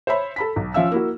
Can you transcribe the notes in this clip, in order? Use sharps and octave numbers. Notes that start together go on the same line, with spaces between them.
C5 C#5 E5 B5
A4 B5 B6
B1
F3 C#4 E5 F5 E6
A#3 E4 F#4